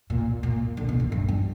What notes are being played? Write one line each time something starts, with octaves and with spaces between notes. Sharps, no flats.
A#2
A#2
D3
A#2
A2
G2
G2